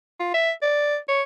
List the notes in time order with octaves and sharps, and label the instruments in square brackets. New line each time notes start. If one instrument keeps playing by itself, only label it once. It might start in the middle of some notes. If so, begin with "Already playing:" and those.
[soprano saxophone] F4
E5
D5
C#5